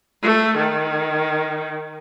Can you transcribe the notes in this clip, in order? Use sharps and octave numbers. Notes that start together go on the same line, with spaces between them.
A3
D#3